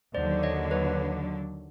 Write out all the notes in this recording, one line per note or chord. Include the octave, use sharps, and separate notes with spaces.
D#2 D3 F#3 C5 D5
C#5 D#5
B4 C#5